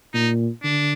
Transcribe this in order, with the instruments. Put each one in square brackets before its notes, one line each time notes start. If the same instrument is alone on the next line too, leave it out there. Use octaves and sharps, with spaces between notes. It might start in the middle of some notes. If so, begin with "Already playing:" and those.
[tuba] A#2 [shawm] D#4
[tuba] D3 [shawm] D4